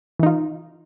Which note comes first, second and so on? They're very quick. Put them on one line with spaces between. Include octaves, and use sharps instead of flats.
E3 D#4 F4